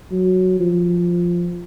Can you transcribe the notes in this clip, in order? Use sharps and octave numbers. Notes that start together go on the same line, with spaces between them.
F#3
F3